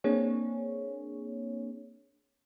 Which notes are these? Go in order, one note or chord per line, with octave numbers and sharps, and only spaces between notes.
A#3 C4 D4 G#4 C#5